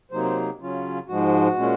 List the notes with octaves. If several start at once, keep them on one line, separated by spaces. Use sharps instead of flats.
C3 F#3 A#3 D#4 C5
C5
C#3 F#3 C#4 F4
G#2 F3 G#3 F#4
A#2 G#3 C#4